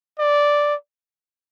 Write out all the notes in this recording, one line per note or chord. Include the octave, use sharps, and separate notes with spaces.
D5